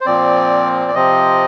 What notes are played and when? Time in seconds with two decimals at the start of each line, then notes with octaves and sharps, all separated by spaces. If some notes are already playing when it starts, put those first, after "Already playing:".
0.01 C5
0.06 A#2 F3 C4 D5
0.88 D5
0.95 C3 F3 C4 D#5